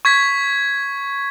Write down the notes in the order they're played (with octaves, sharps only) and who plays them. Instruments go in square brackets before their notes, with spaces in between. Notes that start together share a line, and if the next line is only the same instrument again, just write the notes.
[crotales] C#6 G#6 B6